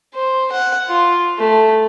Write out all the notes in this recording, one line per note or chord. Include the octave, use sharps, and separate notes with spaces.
C5
F#5
F4
A3